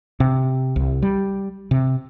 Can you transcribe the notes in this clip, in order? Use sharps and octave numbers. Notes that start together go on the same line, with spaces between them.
C3
C2
G3
C3